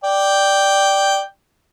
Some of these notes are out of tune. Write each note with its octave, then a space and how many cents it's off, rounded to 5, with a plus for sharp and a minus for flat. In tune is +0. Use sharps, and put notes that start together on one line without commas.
D5 +0 G5 +0